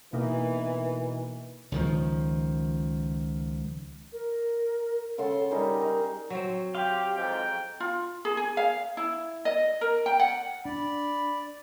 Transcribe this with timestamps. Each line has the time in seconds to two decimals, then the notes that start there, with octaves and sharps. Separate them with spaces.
0.13 B2 E3 A#3 D#4
1.72 C#2 D#3 F3
4.12 A#4
5.18 C#3 A4 F#5 C6
5.50 G3 D#4 G#4 A#4
5.81 D#4
6.30 F#3 C4
6.75 G4 F5 C6
7.16 F2 G#2 G5
7.80 F4
8.25 G#4
8.37 G#4
8.57 F5
8.97 E4
9.45 D#5
9.81 A#4
10.06 G5
10.20 F#5
10.65 D4 D5 B5